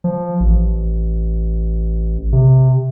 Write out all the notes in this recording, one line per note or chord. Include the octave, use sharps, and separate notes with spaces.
F3
A1
C3